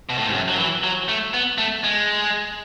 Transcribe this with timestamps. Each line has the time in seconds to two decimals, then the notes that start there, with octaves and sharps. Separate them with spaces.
0.10 B2
0.18 A2
0.26 G#2
0.33 F#2
0.48 F#3
0.58 E3
0.84 F#3
1.09 A3
1.34 B3
1.58 A3
1.84 G#3